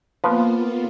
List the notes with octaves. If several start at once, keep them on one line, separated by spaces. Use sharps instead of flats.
F3 A#3 B3 F4 B4